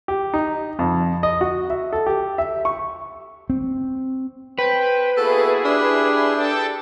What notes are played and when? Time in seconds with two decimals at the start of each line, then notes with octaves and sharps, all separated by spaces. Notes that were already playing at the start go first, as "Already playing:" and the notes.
0.08 G4
0.34 D#4
0.79 F2
1.23 D#5
1.41 F#4
1.70 E5
1.92 A4
2.06 G4
2.38 E5
2.65 C#6
3.50 C4
4.58 B4 C5 G5
5.17 A#3 B3 E4 F#4 G#4 A4
5.65 D4 G4
6.37 A4 G5 A5